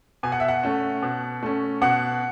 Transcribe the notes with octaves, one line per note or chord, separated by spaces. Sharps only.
B2 G#5
F#5
E5
F#5
A3 C#4
B2
A3 C#4
B2 F#5